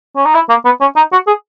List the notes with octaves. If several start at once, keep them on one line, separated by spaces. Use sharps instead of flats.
C#4
D#4
E4
A#3
B3
C#4
D#4
F#4
G#4